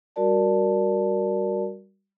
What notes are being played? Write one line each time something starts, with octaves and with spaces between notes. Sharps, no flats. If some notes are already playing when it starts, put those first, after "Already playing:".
G3 F#4 A#4 D5 A5